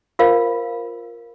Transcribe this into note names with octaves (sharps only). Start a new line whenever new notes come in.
F4 A#4 C5 F5